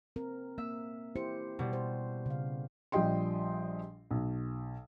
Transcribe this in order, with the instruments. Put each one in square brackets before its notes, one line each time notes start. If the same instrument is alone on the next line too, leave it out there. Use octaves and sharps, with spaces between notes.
[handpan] C4 A#4
[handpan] A#3 [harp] E5
[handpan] E4 G4 C5 [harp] C#7
[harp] B2 G3
[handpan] C5
C#3 F5
[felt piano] A#1 F3 G3 D#5 G5 C6
B1